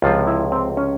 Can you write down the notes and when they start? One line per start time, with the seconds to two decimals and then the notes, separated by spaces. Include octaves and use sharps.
0.02 C#2 C3 F3 F4
0.27 E4
0.52 C4
0.77 C#4